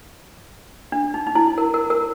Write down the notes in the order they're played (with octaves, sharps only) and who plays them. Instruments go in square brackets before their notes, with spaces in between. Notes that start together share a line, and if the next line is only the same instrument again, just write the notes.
[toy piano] D4
D#4
D#4
E4
A#4
A#4
A#4